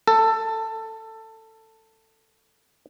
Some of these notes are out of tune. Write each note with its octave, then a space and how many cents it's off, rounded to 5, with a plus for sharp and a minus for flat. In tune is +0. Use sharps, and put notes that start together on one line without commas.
A4 +15